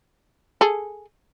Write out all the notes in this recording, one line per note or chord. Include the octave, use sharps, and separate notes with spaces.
G#4 A4